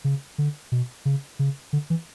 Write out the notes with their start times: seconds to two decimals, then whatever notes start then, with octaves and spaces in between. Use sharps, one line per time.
0.04 C#3
0.38 D3
0.72 B2
1.05 C#3
1.39 C#3
1.73 D3
1.90 E3